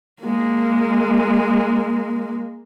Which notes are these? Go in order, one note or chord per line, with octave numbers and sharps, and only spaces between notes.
G#3 A#3